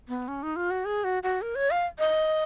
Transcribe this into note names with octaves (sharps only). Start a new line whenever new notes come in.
B3
C#4
D#4
F4
F#4
G#4
F#4
F#4
A#4
C#5
F5
D#5